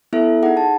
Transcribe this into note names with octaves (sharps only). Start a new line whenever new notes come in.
B3 E4 A4 E5
D#4 G#4 F#5
A5